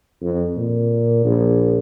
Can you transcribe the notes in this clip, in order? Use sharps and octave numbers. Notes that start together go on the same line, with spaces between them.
F2
A#2
A#1